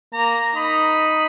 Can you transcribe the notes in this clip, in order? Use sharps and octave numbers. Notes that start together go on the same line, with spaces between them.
A#3 A#5
D#4 B5